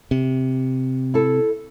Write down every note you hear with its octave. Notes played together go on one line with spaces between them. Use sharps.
C3
E4 A4